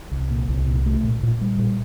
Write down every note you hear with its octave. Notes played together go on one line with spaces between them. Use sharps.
C2
A#2
C2
A#2
A3
A#2
A#2
G3
A#2